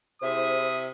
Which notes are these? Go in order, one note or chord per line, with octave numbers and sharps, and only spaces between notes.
C3 E4 G#4 C5 E5 D#6